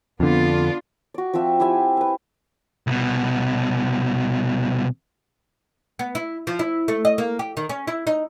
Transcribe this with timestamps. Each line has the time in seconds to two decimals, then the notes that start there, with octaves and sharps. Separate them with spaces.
0.20 F2 D3 B3 D4 F4
1.14 F#4 D5
1.33 F3 C4 F#4 E5
1.60 E4 G4 E5 G#5
1.97 B4 E5
2.87 C2 B2
5.99 B3
6.15 E4
6.47 F3
6.59 E4
6.88 A3
7.05 D#5
7.18 A#3
7.39 G4
7.57 D#3
7.69 C#4
7.88 E4
8.07 D#4